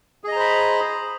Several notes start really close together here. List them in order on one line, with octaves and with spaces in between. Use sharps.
G#4 D#5 A#5 C5 B5